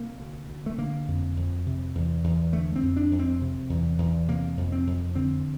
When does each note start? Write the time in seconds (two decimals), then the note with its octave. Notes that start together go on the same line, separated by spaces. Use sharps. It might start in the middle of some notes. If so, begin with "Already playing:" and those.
Already playing: C3 A#3
0.20 D2
0.50 D2
0.66 A3
0.78 D3 A#3
1.08 F2
1.37 F2
1.66 C3
1.95 E2
2.24 E2
2.52 D3 A3
2.76 C4
2.83 F2
2.97 D4
3.11 F2
3.19 C4
3.41 C3
3.70 E2
3.98 E2
4.28 C3 A#3
4.57 F2
4.72 C4
4.87 F2
5.15 D3 C4